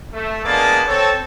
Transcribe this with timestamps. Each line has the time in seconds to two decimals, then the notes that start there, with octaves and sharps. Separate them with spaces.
0.13 A3
0.45 G#3 A#3 B3 D4 A5 D6
0.87 C4 A4 C#5 A5